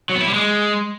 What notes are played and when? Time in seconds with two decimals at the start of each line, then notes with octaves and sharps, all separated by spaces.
0.10 F#3
0.16 B3
0.22 E4
0.28 G3
0.34 G#3